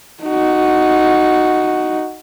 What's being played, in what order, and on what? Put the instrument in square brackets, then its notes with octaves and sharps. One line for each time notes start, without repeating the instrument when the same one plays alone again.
[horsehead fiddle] D#4 F#4